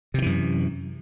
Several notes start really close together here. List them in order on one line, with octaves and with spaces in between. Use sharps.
C3 D#3 E3 F#2